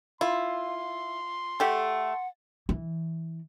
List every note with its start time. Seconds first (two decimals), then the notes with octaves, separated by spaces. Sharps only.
0.21 E4 F4 C6
1.60 A3 G4 A4 F#5
2.69 E3